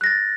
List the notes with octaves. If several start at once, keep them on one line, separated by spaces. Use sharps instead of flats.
F#6 A6 A#6